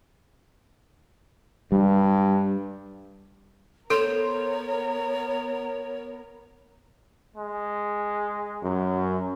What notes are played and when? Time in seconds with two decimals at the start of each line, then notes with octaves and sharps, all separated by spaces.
1.72 G2 G3
3.90 B3 A4 A#4 C5 C#5
7.36 G#3
8.63 F#2